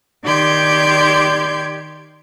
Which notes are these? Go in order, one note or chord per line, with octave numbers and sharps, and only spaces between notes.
D#3 G4 D5 C6 G6 G#6